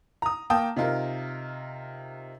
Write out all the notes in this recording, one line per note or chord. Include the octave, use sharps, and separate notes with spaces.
A#5 D#6
A#3 G5 A5 D#6
C3 D#4 F4 A#4